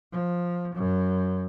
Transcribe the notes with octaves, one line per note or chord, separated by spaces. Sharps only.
F3
F#2